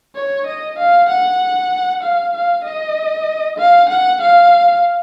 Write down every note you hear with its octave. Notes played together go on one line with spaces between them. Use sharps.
C#5
D#5
F5
F#5
F5
F5
D#5
F5
F#5
F5